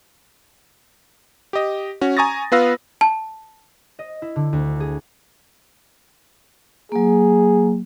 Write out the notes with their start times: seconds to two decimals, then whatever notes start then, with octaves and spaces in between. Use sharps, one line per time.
1.53 G4 D#5
2.01 C#4 F#4
2.17 G#5 A#5 C#6 D#6 A6 A#6
2.52 B3 F4 B4 F5 E6 A#6
3.01 A5
3.99 D#5
4.22 E4
4.36 D3
4.53 D2
4.80 G#4
6.92 F#3 A#3 G#4